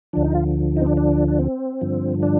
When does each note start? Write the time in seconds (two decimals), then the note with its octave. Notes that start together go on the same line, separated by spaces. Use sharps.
0.13 D2 D3 F3 D4
0.24 D#4
0.35 F4
0.77 D#4
0.81 C4
0.87 D4
0.97 D4
1.28 D4
1.39 C4
1.81 G2 D3 F3
2.23 D4